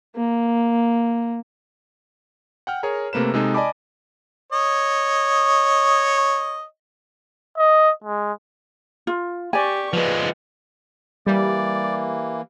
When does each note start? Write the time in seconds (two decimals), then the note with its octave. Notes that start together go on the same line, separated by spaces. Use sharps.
0.16 A#3
2.67 F#5 G5 F6
2.83 G#4 A#4 C#5 A#5
3.13 C3 A3 A#3 B4 E7
3.34 C3 G#3 D#4 G#4 A4
3.54 D5 D#5 G#5 A5 B5 D6
4.53 C#5 D#5
7.58 D#5
8.04 G#3
9.07 F4
9.53 G4 D5 G#5 C#6
9.93 F3 G#3 B4
11.27 E3 G3 A#3 D5